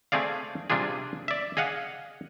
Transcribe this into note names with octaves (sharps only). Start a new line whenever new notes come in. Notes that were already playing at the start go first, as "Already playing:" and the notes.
A3 C4 G#4 D5 F5
C3 G3 D4 F4 G#4
D5 E5
G#4 D#5 F5 F#5